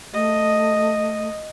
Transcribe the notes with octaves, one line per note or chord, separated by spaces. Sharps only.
A3 D#5